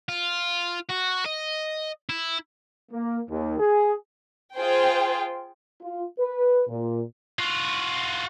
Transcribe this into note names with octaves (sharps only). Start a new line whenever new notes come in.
F4
F#4
D#5
E4
A#3
D#2
G#4
F4 G#4 C5 G5
F4
B4
A#2
F4 F#4